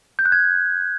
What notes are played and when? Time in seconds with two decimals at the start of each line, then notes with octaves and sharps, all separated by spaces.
0.19 G6
0.25 F#6
0.32 G#6